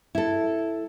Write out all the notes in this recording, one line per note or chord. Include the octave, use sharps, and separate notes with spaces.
E4 A4